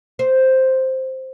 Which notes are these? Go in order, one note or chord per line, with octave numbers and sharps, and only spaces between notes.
C5